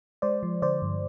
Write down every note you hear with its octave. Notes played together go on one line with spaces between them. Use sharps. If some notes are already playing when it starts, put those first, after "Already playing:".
G#3 C5 D5
F3
D3 C5 D5
G2